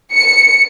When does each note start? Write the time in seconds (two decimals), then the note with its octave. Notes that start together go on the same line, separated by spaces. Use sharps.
0.12 C#7